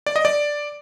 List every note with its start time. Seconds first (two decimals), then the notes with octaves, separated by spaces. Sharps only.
0.07 D5
0.16 D#5
0.25 D5